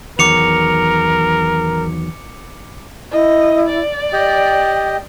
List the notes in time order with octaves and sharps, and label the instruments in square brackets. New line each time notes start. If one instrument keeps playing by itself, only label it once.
[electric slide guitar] E2 D#3 F#3 [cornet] A#4 [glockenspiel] D6 C#7 F7
[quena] E4 [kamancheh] D#5
[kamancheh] D5
[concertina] G4 D#5 [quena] G5